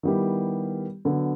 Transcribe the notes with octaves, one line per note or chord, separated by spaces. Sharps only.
D#3 G3 B3 E4 G4
D3 F#3 B3